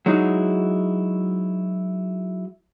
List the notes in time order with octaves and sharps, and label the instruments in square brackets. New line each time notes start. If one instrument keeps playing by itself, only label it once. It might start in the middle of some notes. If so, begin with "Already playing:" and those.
[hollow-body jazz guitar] F#3 G#3 D#4 E4 F#4